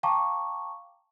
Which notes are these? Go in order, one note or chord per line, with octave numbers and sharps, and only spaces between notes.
F5 G5 A5 A#5 C#6 D6